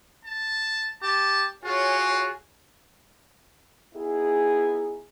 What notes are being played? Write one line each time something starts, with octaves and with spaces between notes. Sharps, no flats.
A5
G4 A5
F4 F#4 G#4 C#5
B3 D#4 E4 G#4